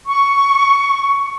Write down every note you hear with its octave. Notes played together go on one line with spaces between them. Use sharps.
C#6